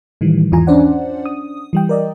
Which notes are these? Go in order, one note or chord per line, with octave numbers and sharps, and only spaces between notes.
A2 D#3 E3 G3
E2 G#2 E3 F4 G#5 A#5
C#4 D4 C5 D5 F#5
D#6
E3 G3 G5
A#4 D5 D#5